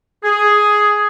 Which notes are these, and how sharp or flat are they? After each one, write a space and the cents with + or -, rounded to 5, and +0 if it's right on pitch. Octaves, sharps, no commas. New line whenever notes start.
G#4 +5